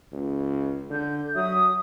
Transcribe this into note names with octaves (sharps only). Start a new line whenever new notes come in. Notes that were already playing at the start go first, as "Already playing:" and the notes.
C#2
D3 G6
F#3 E5 D#6